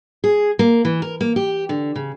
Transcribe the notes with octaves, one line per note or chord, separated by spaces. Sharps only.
G#4
A#3
E3
A#4
A#3
G4
D3
C#3